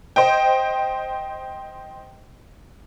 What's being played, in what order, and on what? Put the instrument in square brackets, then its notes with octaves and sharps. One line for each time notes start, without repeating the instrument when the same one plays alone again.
[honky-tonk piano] C5 D#5 G5